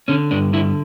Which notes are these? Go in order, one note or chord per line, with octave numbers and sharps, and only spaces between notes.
D3 C#4
G2 D4
D3 E4